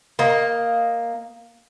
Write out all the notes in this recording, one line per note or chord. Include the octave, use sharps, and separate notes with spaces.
A#3 D#5